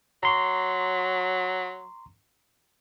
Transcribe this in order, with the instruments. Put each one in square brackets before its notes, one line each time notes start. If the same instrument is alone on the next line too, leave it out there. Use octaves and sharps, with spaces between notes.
[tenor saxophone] F#3 [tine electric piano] A#5 C6 C#6